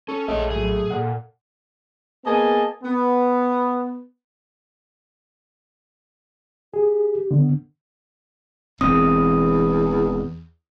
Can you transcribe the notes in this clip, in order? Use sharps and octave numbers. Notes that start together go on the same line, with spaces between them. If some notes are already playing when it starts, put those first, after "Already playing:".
C#4 A4
A#1 A3 G#4 C#5 D#5 A5
A2 F#3 G#4
A#2 A4 F#5
A#3 B3 G#4 D#5 G#5 A5
B3
G4 G#4
D3 B3
E1 E2 C4 D#6